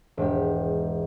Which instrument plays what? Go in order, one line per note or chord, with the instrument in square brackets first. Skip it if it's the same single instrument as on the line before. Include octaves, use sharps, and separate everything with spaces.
[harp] E1 G#2 G4